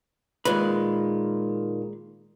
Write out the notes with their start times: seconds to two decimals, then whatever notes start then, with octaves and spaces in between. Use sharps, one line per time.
0.45 A#2 D#3 G#3 B4